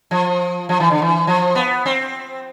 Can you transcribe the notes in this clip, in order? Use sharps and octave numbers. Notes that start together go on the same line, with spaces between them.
F3
F3
E3
D3
E3
F3
B3
C4